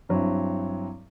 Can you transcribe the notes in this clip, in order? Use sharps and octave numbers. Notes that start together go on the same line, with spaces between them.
G2 F#3 C4 E4